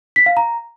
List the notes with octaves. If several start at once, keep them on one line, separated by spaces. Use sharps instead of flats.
B6
F5
A#5